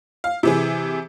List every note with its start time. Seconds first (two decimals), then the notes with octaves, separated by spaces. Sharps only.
0.24 F5
0.43 C3 E3 G#4